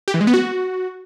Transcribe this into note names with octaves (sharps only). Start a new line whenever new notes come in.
G4
E3
G#3
B3
F#4